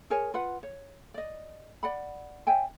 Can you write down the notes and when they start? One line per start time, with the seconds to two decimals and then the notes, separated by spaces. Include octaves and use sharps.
0.10 G#4 A#4 C#5 G#5
0.34 F4 B4 F#5
0.63 C#5
1.14 D5 D#5
1.83 D5 F#5 B5
2.47 C#5 E5 G5 G#5